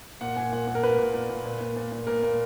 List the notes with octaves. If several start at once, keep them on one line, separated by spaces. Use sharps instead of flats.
A#2 F#5
A#2 G#5
A#2 F#5
A#2
A#4
A#2 B4
A#2
A#2
A#2
A#2
A#2
A#2
A#2
A#2 A#4
A#2